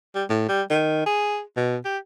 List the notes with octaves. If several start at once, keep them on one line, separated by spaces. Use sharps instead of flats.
G3
A2
G3
D#3
G#4
B2
G4